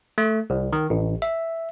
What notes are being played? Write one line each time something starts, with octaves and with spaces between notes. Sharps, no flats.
A3
C2
D#3
A1
E5